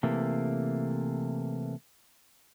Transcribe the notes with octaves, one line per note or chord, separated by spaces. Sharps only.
C3 E3 A3 A#3